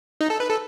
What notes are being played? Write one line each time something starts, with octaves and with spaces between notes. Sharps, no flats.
D#4
A4
B4
A4